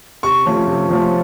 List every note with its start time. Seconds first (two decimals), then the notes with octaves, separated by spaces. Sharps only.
0.23 C3 C#6
0.46 F3 A3 C#4 F4
0.67 C3
0.89 F3 A3 C#4 F4